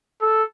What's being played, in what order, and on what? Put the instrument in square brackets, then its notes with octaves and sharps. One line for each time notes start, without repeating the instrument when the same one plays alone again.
[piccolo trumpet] A4